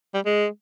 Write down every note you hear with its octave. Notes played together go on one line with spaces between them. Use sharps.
G3
G#3